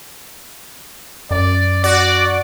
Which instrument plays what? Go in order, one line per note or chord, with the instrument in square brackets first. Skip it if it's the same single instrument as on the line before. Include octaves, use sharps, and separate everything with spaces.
[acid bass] F#2 [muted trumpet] D5
[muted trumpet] F#4 [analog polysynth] D5